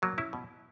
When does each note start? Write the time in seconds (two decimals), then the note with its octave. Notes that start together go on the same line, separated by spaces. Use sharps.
0.02 B2 F#3 A#3
0.18 C#4 E4
0.33 B2